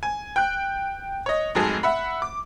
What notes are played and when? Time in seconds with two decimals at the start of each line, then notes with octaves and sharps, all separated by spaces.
0.03 G#5
0.36 G5 F#6
1.26 C#5 D#5
1.55 F1 G#2 F#3 G#4 A4
1.83 E5 F#5 B5
2.22 D6